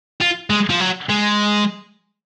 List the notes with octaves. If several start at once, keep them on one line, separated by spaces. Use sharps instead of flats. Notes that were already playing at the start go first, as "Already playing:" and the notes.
F4
G#3
F3
F#3
G#3